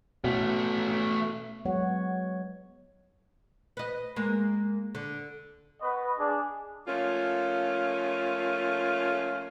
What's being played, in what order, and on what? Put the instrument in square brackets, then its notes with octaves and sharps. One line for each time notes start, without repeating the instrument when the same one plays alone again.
[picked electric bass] B2 [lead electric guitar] A3 C#4
[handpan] F#3 G#3 B3 C#5 F#5
[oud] B4 D#5
G#3 A#3
D3
[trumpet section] B3 B4 D#5 C#6
D4 G#4
[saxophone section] F3 A3 A#3 C#4 F4